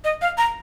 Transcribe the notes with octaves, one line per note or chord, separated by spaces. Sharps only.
D#5
F5
A#5